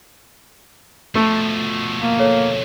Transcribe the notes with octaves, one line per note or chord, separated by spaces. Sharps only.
B2 F3 A3
A#3
A4 C#5